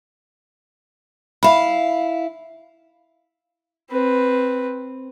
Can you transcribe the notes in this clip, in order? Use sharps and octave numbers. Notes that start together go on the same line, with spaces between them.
E4 E5 F5 B5
C4 B4